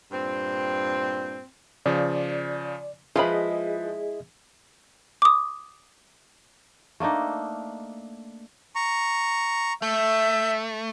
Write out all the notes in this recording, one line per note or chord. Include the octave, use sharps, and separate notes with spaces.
G2 A#2 C4
C#3 F3 D5
F3 G#3 E4 F4 G#4 B4 D#5 B5
D6 D#6
A3 A#3 D4 D#4
A#5 C#6
A3 E5 G6